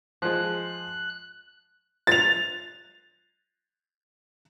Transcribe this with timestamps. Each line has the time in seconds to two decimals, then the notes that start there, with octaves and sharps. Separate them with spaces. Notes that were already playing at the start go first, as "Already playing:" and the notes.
0.22 F3 G#3 F#6
2.07 A6 F7